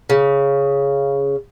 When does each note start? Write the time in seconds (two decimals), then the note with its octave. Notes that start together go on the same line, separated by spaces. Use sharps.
0.10 C#3